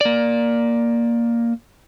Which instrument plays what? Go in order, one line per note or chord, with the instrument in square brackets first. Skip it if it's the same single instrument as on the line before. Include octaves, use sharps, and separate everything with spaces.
[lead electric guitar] A#3 D5